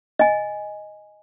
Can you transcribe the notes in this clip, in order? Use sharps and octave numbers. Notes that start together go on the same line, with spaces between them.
D#5 G#5